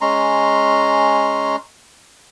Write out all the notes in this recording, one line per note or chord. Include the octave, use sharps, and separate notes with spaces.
G#3 C#4 A#5 C6